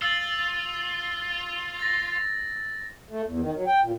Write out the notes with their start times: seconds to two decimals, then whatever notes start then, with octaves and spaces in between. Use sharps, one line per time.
0.02 F4 E6 A6 F#7
1.79 A6 A#6
3.11 A3
3.26 E2
3.40 D#3
3.55 F#3
3.67 G5
3.84 A#2